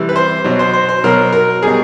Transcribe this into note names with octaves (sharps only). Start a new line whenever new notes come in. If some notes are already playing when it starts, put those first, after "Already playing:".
Already playing: C3 E3 G3
B4
C5
B2 F#3
C5
C5
C5
B2 F#3 A#4
A#4
B2 G3 G#4